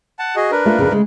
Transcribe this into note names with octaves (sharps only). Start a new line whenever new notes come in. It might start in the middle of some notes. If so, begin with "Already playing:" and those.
F#5 A5
F#4 G#4 D#5
D4 A#4 B4
A3 A#3 F4
F2 C#3
C#3 G#3 A3